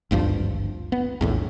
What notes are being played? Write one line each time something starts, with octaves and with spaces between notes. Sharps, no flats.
G#1 D2 G2 F3
B3
A#1 E2 A2